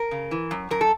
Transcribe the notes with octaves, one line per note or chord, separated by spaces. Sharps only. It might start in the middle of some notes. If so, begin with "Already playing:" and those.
Already playing: A#4
C#3
E3
F#2
F#2 A#4
A4